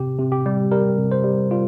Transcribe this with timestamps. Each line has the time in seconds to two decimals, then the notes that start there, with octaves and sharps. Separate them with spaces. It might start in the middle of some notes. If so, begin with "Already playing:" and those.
Already playing: C3 G4
0.19 C3
0.32 G4
0.46 G3
0.72 G3 A#4
0.98 C3
1.12 C5
1.24 G3
1.51 G3 F4